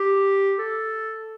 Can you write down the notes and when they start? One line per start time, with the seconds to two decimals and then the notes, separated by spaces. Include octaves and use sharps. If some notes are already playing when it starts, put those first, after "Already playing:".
Already playing: G4
0.59 A4